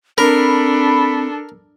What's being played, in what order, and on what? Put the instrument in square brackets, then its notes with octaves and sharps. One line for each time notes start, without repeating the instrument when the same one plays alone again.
[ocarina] C4 [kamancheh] D4 A4 [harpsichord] A#4 [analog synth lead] B5